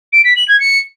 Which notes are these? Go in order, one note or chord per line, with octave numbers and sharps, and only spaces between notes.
D7
B6
F#7
G#6
C#7